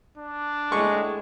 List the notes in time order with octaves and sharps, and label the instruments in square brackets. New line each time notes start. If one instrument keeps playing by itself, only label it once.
[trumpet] D4
[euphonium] A2 [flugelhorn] G#3 [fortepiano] C#6